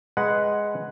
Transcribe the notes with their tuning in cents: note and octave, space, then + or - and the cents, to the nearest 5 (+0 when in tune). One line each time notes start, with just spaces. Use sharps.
G#3 +0 B4 +0 F#5 +0